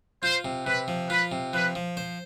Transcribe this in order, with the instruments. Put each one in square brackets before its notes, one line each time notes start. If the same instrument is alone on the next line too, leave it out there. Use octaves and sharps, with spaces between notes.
[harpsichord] F4 [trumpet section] C5
[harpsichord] C3
[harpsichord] C3 [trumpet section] B4
[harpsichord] F3
[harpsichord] F4 [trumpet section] B4
[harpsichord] C3
[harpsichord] F3 [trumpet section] B4
[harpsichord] F3
C5